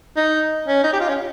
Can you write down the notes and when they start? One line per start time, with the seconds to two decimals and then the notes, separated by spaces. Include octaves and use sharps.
0.16 D#4
0.67 C#4
0.83 D#4
0.93 G4
1.00 F4
1.08 C#4